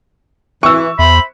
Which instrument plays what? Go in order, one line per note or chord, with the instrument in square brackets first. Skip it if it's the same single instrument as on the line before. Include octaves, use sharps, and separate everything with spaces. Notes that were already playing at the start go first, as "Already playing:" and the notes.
[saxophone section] E3 [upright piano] C#6 E6
[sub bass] E2 [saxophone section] C5 E5 [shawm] B5